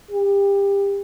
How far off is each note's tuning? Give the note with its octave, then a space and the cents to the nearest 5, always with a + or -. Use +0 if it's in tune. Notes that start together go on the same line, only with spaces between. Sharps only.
G4 +25